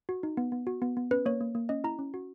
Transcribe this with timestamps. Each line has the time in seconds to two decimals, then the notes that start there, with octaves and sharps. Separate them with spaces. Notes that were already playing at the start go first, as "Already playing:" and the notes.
0.09 F#4
0.23 D#4
0.37 B3
0.52 B3
0.67 F#4
0.82 B3
0.97 B3
1.11 C#4 B4
1.26 A#3 C#5
1.41 A#3
1.55 A#3
1.69 C#4 D#5
1.84 E4 A#5
1.99 C#4
2.14 F#4